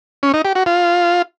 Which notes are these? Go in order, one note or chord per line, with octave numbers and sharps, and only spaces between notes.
C#4
D#4
G4
F#4
F4